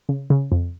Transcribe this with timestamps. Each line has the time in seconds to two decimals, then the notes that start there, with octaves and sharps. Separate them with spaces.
0.09 C#3
0.30 C#3
0.52 F2